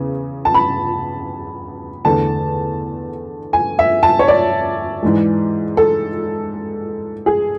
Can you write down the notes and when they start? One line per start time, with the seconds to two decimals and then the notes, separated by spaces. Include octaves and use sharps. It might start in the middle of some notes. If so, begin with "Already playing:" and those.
Already playing: E2 C#3
0.45 A5
0.54 B5
2.05 E2 D3 A3 A5
3.53 G#5
3.79 E5
4.03 A5
4.19 C#5
4.28 D5
5.03 G#2 E3 G#3
5.77 A4
7.26 G#4